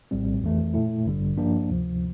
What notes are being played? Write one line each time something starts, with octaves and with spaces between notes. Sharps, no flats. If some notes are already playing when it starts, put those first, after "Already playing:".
A#1 A2 G3 C4
F2 E3 A3
A#2 A3 E4
A1 G2 D3 G3
G2 F3 A#3 D4
D2 C3 F3